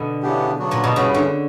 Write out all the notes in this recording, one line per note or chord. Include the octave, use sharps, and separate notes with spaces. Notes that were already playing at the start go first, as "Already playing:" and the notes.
Already playing: B2 D3
C#3 E3 B3 D4 G4
C#3 F#3 B3 D4 F#4
A#2
B2
G2 C#3 E3 B3 F#4
D3